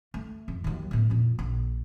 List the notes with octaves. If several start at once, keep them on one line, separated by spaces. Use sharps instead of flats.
A3
F2
D#2 F#3
A2 B3
F2 A#2
A#1